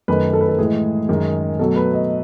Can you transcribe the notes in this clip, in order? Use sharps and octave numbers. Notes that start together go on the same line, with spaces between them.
F#2 D#3 A3 B4
A4
B4
A4
A2 E3 G#3 G#4
F#2 D#3 G#3
B2 F#3 A3 A4
B4
D#5